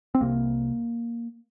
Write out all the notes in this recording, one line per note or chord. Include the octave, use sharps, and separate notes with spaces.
C4
C2 C3 A#3